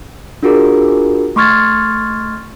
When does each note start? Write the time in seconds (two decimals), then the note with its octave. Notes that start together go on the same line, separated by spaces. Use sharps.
0.43 D4 F4 F#4 G#4 A#4
1.36 A3 C6 C#6 F6 G#6 A6